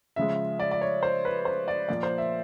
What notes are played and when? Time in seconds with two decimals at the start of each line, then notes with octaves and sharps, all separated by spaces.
0.16 C#3 F3 G#3 E5
0.60 D5
0.71 D5
0.81 C#5
1.03 C5
1.25 B4
1.45 C5
1.68 D5
1.89 A#2 F3 A#3 D5
2.03 C5
2.18 E5